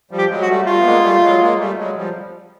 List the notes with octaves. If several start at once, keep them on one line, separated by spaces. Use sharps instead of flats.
F3 G3
G4
F#3 G#3
F#4
G3 A3
G3 A3 F4
B3
G#3 A#3
G3 A3
F#3 G#3
G#3 A#3
G3 A3
F#3 G#3
F3 G3